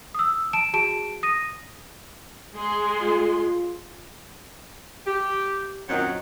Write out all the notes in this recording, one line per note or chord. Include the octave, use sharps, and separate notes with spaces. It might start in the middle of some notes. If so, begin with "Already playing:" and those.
D#6 E6
A5 D7 E7
F#4 G#4 A5 D7 E7
D#6 A#6 D#7
G#3 G#4 C6
F4
G4
F#2 A#2 D#3 F#3 C4 F#5